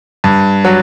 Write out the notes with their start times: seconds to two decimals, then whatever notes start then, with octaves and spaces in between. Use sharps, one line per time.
0.24 G2
0.65 F#3